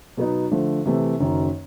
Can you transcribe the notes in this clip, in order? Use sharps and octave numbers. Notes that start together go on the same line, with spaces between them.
B2 F#3 B3 D#4
D3 F3 A3
C3 E3 A3
F#1 F#2 D#3